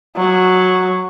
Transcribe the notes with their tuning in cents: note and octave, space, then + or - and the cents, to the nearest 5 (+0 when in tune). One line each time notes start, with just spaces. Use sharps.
F#3 -5